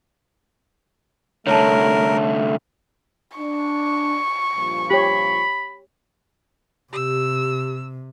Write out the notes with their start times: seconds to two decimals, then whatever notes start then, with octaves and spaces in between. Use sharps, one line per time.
1.47 C2 D3 A3 A#4 C#5 A5
3.38 D4 C#6
4.55 G2 A#2 F3
4.91 G4 C#5 B5
6.93 C3 G4 E6